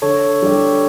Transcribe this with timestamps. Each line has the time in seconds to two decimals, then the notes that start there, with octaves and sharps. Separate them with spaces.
0.02 D3 A4 C#5
0.42 G3 D4 G4